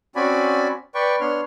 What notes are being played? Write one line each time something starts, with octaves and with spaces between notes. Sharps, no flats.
C4 C#4 F#4 D5 G#5 B5
B4 D5 G5 C#6
B3 D4 C#5 C6 F6